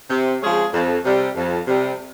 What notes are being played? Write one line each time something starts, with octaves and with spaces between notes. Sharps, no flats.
C3
F3 G#3 C#4 G#4
F2
C3 G3
F2
C3 G3